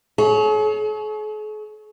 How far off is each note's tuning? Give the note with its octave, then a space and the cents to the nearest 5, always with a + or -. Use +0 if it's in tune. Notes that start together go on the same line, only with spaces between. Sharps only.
G#4 +45 C#5 +0